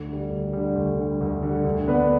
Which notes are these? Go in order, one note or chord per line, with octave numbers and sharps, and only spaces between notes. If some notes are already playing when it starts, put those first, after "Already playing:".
Already playing: D2
D3 G3
D2
D3 G3
D2
D3 G3
D2
D3 G3
D2
D3 B3 D4 B4